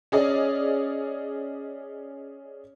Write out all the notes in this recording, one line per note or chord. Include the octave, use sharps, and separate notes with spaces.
C#4 G#4 D5 D#5